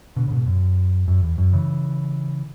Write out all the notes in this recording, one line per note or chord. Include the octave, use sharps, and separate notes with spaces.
B2 D3
C#3
G#2 B2
F#2
F#2
E2
F#2
C#3 E3